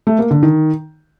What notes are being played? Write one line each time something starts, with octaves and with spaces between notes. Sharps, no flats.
A3
A#3
D3
D#3